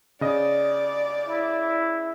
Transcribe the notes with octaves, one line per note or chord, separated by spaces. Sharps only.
C#3 D5 D#5
E4